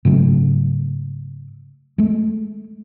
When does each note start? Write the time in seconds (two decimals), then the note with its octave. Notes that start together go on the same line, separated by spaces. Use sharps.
0.05 G#2 C#3 F#3 A3
1.98 G#3 A3